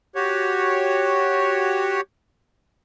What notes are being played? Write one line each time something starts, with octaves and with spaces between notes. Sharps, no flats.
F#4 G4 C#5